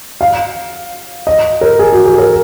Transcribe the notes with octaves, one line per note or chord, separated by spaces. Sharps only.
F5
D#5
A#4
G#4
F#4
G#4
A#4